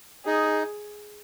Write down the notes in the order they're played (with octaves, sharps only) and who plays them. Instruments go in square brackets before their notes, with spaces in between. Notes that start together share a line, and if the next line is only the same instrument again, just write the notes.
[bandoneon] D#4 [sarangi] G#4